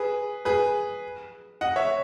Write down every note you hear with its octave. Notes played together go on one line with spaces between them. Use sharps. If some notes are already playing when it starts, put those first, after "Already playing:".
Already playing: G#4 B4
G#4 B4
D#5 F#5
C#5 E5